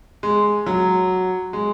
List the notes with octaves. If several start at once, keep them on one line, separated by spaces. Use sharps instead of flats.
G#3
F#3
G#3